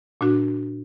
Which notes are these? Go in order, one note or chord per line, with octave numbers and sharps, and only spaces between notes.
A#2 D4 F#4